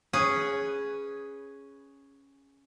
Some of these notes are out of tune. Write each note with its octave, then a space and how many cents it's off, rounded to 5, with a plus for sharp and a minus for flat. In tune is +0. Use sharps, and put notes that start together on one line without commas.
C#4 +0 G#4 +0 B4 +0